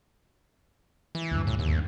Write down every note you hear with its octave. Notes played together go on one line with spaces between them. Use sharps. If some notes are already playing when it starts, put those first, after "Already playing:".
E3
D2 G2
A2
D#2